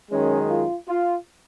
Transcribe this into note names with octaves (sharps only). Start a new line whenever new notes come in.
F#2 D#3 G#3 C#4
F4
F4